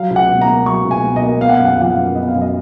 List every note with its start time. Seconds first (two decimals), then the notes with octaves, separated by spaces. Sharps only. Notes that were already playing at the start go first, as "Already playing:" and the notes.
Already playing: F#3 F5
0.10 C#2
0.16 F#5
0.29 B2
0.41 A#5
0.48 A#3
0.66 F#3 C#6
0.84 C#2
0.91 G#5
1.04 B2
1.16 D#5
1.22 A#3
1.41 B3 F5
1.49 F#5
1.57 F#2 F5
1.65 F#5
1.74 F5
1.78 F3 F#5
1.90 F5
1.96 F#2
2.15 B3 D#5
2.28 F5
2.34 F#2
2.41 D#5